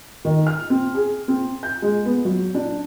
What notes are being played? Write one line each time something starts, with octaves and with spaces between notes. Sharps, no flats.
D#3
F6
C4
G#4
C4
G6
G#3
B3
F#3
D4